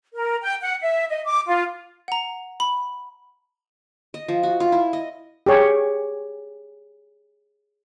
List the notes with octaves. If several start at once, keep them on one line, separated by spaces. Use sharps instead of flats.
A#4
G5
F#5
E5
D#5
D6
F4
F#5 A#5
B5
D#5
F3
F#4
F4
E4
D#5
G4 G#4 C#5